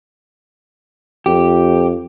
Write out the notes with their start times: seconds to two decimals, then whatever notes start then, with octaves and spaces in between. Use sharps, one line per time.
1.26 F2 G4